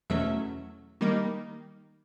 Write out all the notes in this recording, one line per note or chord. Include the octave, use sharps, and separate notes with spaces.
E2 B2 F#3 A3 C#4 E5
D#3 G3 A#3 D#4